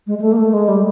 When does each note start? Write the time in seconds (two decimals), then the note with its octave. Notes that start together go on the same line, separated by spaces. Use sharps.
0.07 G#3
0.18 G#3
0.22 A3
0.32 A#3
0.37 A3
0.53 G#3
0.68 G3